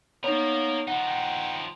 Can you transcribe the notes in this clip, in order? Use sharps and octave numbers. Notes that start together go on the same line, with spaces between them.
A#3 B3 D#4 A#4 C#5
F3 D#4 F#5
G5